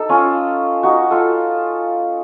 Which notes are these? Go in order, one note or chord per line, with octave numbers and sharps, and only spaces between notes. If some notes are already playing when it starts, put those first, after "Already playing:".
Already playing: D#4 A4
C#4 F4
D#4 F#4
F4 A4